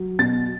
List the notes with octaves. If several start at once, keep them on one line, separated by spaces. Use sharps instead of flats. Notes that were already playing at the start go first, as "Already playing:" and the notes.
Already playing: F#3
B2 A6